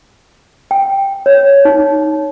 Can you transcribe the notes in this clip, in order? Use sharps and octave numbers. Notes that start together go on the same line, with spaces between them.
G5
C#5
D#4